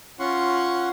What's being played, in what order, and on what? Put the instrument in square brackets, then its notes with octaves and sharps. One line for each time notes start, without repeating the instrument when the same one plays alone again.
[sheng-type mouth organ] C#4 F4 F#5 C6 C#6